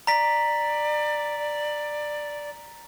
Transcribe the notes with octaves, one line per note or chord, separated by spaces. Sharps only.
D5 A#5 B6